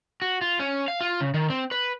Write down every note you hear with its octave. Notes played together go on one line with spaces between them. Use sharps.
F#4
F4
C#4
F5
F4
C#3
D#3
C4
B4